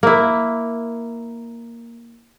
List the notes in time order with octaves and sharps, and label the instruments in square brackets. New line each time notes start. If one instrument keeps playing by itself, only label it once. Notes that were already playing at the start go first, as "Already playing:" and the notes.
[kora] A#3 E4